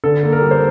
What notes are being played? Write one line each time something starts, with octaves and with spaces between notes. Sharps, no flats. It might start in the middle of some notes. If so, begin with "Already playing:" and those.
D3 A4
A#3
A#4
G3
C5